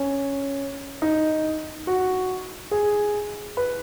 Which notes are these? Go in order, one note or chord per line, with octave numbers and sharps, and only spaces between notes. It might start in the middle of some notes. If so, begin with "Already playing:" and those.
Already playing: C#4
D#4
F#4
G#4
B4